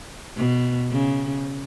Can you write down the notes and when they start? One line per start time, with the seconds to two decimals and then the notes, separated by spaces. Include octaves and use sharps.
0.36 B2
0.92 C#3